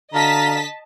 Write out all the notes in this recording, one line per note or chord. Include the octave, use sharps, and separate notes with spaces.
D3 F#4 D#5 F5 A5 A#5 B6